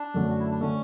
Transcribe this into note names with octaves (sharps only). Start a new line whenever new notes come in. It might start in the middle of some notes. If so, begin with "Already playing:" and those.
Already playing: D4
F#2 D3 A3
F#4
E4
D4
D3 A3 C#4